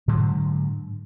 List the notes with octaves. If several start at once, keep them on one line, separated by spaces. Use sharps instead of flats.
G#2 D3 F#3 G#3